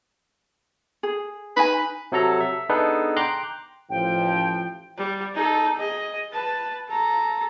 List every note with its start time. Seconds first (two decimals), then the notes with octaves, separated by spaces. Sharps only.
1.03 G#4
1.57 D#4 B4 G#5
2.12 C3 F#3 A4 A#5
2.41 E5
2.69 B3 D4 D#4 G#4 A4 B4
3.16 G5 A#5 C6 D6 F#6 G6
3.90 A1 F3 G5
4.98 G3
5.35 D#4 A4
5.77 G#4 D#5
6.33 B4 A5
6.89 A4 A#5